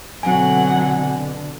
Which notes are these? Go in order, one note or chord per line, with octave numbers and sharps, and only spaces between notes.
B2 D3 F#3 C4 F#5 G#5